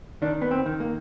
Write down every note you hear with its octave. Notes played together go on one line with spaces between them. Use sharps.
D#3 D4
B3
C4
D#3
A#3